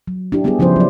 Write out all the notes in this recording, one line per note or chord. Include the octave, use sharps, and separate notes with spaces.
F#3
D4 E4 G4
G3 B3 D4 E4 G4 G#4
C#3 F3 C#4 E4 C5
F#3 D5